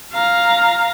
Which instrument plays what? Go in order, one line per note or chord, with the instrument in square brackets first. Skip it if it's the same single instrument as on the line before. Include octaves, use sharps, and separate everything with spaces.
[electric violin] F5 A#5